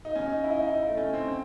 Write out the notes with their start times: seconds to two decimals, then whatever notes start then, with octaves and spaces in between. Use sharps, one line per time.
0.05 D#4
0.15 C#4
0.26 D#4
0.44 E4
0.50 D#4
0.58 E4
0.67 D#4
0.78 E4
0.88 A3
0.97 C#4
1.13 C4
1.28 C4